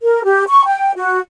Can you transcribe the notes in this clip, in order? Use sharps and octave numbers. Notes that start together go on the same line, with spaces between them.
A#4
G4
C#6
G5
F#4